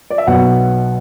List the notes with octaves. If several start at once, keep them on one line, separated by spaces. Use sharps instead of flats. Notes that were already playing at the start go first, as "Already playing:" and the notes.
D5
E5
B1 B2 F#3 F#5